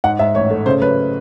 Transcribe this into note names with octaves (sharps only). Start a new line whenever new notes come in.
G#2 F#5
G#2 E5
A1 C#5
A3
C#3 C5
F#3 B4